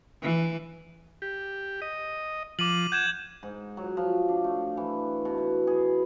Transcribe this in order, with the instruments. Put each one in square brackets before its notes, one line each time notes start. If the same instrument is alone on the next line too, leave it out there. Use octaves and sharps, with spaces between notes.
[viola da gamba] E3
[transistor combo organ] G4
D#5
[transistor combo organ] F3 [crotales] D6 D#7 F#7
[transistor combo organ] F#5 [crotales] G6 G#6 E7
[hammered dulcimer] G#2
F#3
F3
D4
A3
E3
B2
E4
G#4